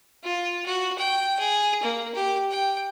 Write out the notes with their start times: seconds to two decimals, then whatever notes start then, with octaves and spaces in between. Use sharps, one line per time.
0.23 F4
0.65 F#4
0.98 G5
1.39 G#4
1.83 A#3
2.15 G4
2.51 G5